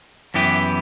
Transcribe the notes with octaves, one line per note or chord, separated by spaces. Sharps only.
F#2 E3 B3 E4 G4